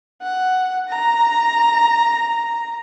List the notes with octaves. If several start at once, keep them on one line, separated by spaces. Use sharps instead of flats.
F#5
A#5